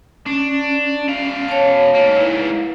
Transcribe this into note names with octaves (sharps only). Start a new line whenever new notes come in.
C#4 D4
B2 F5
C#5 A5
G#2 A#3
E4 B4